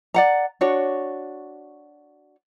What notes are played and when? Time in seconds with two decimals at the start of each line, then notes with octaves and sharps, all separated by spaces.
0.14 D5 F#5 A#5
0.61 D4 F#4 C#5